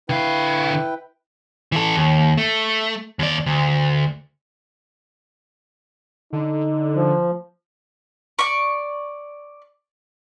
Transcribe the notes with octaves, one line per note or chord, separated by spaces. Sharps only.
D3 E4 B4 F5 G5
E3 A4
D#2
A3
D#2 D5
D2
D3 D#4
F3
D5 C#6